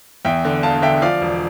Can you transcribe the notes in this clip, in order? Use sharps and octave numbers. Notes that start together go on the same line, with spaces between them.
E2 E5 G5
D3
E1 F5 A5
D3 E5 G5
F3 D5 F5
E1